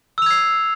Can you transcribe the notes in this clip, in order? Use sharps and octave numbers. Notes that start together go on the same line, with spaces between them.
E6 G#6 C7 F7